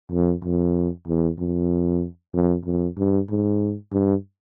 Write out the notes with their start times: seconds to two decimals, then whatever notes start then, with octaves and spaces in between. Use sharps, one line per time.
0.12 F2
0.44 F2
1.08 E2
1.39 F2
2.34 F2
2.65 F2
2.97 G2
3.30 G#2
3.92 G2